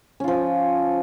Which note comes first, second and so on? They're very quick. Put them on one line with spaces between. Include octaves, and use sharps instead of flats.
C#4 F4 F3